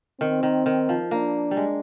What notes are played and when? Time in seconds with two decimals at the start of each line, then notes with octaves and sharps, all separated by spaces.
0.20 D#3 C4
0.43 D#3
0.66 D#3
0.89 F3
1.11 A#3 D4
1.51 G3
1.57 G#3